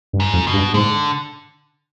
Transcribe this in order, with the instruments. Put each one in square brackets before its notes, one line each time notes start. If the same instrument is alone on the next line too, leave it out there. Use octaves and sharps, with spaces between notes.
[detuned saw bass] G2
[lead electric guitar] G#2
[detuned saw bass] F2
[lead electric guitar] B2
[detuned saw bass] G2
[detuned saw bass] G#2 [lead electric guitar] D3